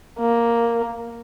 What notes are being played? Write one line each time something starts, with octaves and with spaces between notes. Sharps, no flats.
A#3